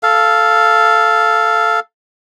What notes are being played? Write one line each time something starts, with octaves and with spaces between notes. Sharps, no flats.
A4 F5